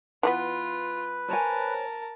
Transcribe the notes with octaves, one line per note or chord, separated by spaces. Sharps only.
E3 A3 B3 F4 B4
A#4 C5 C#5 G#5 A5